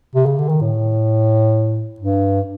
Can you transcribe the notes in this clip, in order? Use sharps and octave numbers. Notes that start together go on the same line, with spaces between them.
C3
C#3
D3
D#3
A2
G2